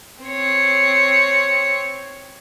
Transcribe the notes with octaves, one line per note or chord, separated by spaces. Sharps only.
C4 C#5